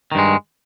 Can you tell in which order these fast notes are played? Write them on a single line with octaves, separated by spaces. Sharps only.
D#3 G2 G#3